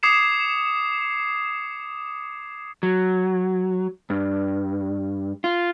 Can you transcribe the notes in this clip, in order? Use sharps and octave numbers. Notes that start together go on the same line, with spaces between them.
D6 D#6 G#6 C7 C#7 E7
F#3
G2
F4